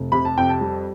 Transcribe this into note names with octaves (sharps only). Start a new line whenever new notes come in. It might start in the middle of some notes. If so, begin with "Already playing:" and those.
Already playing: F1
C3 B5
A5
F2 G5
A5
G3